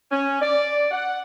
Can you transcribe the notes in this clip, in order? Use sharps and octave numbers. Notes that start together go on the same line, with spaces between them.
C#4
D5
F#5